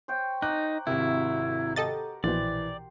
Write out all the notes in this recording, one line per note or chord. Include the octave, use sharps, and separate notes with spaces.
C5 C#5 G5
D#4 A#5 D6 F#6
G#1 C3 E4 F#4 A#4
G4 A4 D#5 F#5 A#5 A6
A#1 B2 E3 C5 D5